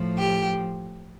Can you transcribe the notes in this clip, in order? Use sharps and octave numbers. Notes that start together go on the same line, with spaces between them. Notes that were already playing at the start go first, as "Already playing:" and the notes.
Already playing: A2 F3
G4